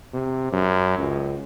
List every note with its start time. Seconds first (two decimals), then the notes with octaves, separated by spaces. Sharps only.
0.14 C3
0.52 F#2
0.99 C#2